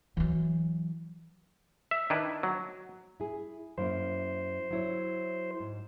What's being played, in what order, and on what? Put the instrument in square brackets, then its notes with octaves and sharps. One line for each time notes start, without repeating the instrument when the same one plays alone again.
[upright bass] E3 F#3
[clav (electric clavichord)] E5
D#3 D4 E4 B4
F#3
[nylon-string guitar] E4 G#4
[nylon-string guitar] F#2 A#3 E4 [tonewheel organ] C5
[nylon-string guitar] F#3 E4 C#5
G#2